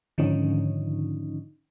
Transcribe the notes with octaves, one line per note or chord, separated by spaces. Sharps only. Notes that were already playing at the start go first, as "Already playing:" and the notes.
G#2 D3 D#3 F3 C#4 D#4